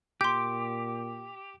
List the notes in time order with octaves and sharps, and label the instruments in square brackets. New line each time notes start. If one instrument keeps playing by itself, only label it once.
[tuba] A#2 [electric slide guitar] G4 [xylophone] C6 G6 [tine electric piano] D6